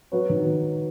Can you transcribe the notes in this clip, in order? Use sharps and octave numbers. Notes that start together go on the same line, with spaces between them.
F#3 B4 C#5
D#3